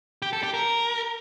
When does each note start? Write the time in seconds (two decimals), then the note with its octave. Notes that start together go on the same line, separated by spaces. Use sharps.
0.22 G4
0.33 A4
0.43 G4
0.54 A#4